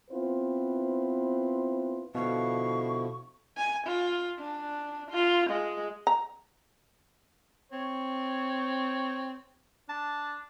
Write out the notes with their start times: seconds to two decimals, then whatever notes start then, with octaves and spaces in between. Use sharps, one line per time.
0.10 B3 C4 E4 F4 B4 C5
2.15 B2 D3 F3 E4 F5 C#6
3.57 G#5
3.87 F4
4.39 D4
5.11 F4
5.50 G#3
6.07 A#5
7.72 C4 C#5
9.89 D4 A5